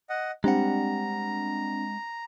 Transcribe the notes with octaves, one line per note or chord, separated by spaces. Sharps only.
D#5 F#5
G3 G#3 C4 D4 F#5 A#5